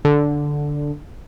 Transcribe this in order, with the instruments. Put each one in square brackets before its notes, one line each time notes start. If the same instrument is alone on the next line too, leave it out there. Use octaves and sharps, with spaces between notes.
[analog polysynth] D3